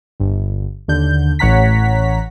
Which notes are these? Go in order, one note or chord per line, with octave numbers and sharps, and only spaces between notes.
G1
D#2 D3 G6
A1 C#5 F#5 A#5 B6